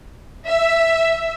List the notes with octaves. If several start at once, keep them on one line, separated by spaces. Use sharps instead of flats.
E5